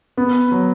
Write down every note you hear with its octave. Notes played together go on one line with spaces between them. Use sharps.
B3
F#3